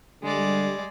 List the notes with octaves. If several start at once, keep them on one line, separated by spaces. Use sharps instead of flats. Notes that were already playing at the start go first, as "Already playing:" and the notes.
D3 G3 G#3 D5